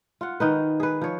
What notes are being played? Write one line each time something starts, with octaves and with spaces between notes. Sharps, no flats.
F4 F#5
D#3 D#4 B4
G#4 B4
F3 C#5